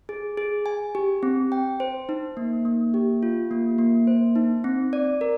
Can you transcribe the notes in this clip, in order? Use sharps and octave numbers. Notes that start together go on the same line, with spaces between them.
G#4
G#4
G#5
G4
C4
G5
C5
D#4
A#3
A#3
G4
F4
A#3
A#3
C5
D#4
C4
D5
A#4